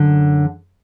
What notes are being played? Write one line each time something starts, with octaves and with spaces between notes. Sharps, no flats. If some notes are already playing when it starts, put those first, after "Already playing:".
Already playing: F#2 D3